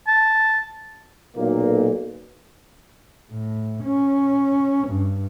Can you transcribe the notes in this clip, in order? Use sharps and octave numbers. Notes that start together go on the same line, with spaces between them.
A5
B1 A#2 A#3
A2
C#4
G2